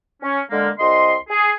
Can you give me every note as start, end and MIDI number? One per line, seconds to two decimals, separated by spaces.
0.23 0.40 61
0.51 0.69 50
0.51 0.69 56
0.51 0.69 58
0.79 1.15 36
0.79 1.15 75
0.79 1.15 84
1.29 1.53 68